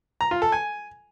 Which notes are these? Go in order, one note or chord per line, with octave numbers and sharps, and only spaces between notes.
A#5
F4
A4
G#5